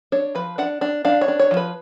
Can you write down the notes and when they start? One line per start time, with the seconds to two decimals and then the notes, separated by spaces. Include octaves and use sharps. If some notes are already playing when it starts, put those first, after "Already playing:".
0.12 D4 C#5
0.35 F3 B4
0.58 D4 F#5
0.81 D4
1.05 D4 F5
1.21 C#5
1.28 D4
1.39 C#5
1.51 F3
1.57 B4